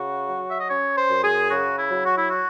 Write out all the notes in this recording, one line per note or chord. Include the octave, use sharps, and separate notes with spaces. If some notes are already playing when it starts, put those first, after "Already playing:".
Already playing: C#3 F#4
F#3
E5
D#5
C#4 C#5
C5
F#2
G#4
C#3 F#4
E4
F#3
F#4
E4
F#4